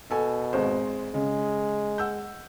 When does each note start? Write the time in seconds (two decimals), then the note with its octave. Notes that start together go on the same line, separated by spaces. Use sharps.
0.11 B2 A4 G#5
0.53 G#1 G#3 C5
1.14 C#3 G#3
1.98 F#5 E6 G6